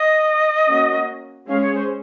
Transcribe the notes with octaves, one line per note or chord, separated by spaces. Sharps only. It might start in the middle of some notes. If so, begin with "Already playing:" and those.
Already playing: D#5
A#3 C#4 F#4
G#3 C#4 G#4 F5
C#5
C5